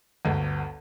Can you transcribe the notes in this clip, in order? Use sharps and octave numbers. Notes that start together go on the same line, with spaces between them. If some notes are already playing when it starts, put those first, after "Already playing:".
G1 D2